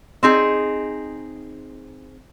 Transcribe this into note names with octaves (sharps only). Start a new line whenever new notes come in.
C4 D#4 G#4